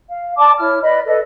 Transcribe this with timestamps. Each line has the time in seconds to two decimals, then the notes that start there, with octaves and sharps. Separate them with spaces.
0.10 F5
0.36 D5 A5 D6
0.59 E4 C#5 F6
0.83 B4 D5 D#5 B5
1.07 A4 B4 D5 D#5